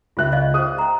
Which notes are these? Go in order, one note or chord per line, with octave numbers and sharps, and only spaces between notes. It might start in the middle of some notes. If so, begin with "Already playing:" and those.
C#2 F4 A#4 E5 F#6
D5 D#5 F5
G#4 C5 D#6 F#6
G5 A#5